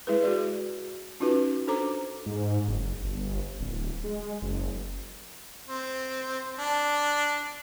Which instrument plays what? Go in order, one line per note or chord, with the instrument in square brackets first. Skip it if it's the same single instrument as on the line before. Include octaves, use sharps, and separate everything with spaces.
[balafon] G#3 E4 G#4 B4
F#4 G#4 D5
C#4 D#4 F4 F#4 B4
D4 A4 C5 A#5 D6
[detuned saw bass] G#2
F#1
G1
D1
G#3
F#1
[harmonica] C4
D4